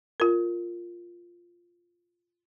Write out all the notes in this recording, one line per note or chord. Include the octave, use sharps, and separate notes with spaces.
F4 A#4